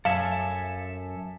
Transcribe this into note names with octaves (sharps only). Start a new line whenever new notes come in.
F#2 A4 E5 F5 G#5